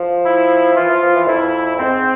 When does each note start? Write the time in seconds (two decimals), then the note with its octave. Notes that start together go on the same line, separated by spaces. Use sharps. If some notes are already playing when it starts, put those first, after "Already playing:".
Already playing: F3
0.25 E4
0.76 E3 F4
0.89 F3
1.02 F3
1.15 E3
1.27 F2 E4
1.78 G#2 C4